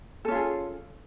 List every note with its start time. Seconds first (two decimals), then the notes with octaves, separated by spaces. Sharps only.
0.25 A4
0.28 C#4
0.31 F4
0.35 G#4